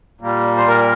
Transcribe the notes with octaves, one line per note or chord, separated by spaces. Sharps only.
A#2 G3 A#3
C5
A#4